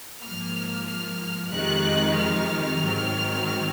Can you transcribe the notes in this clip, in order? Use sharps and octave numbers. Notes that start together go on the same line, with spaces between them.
G#2 F3 A#3 F6
F6
F2 C3 D#3 G#3 D#4 F#6
F6
G#2 D#3 F#3 C4